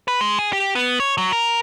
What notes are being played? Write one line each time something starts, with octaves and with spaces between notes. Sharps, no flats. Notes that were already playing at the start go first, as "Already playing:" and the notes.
B4
G#3
G#4
G4
B3
C#5
F#3
A#4